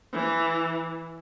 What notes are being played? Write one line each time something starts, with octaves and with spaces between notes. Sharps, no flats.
E3